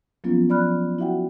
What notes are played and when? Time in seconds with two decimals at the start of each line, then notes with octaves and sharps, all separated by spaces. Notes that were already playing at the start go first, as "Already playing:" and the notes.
0.24 F3 F#3 A#3 B3 C#4 F4
0.49 F3 D5 B5 F6 F#6
0.99 E4 F#4 E5 F#5 G5